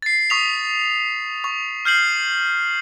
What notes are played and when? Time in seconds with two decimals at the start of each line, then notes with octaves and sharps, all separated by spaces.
0.02 A6 C7
0.30 C#6 D#6 B6 F7
1.44 C#6
1.85 F6 G6 C7 F#7